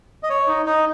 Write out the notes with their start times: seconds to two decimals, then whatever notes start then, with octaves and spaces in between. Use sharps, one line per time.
0.23 D#5
0.29 C#5
0.48 D#4
0.66 D#4